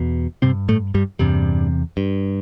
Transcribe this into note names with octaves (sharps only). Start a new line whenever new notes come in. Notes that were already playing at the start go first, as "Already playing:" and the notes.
Already playing: E2 B2
G2 C3 C4
A2 A3
G2 G3
E2 G2 C3 G3
G2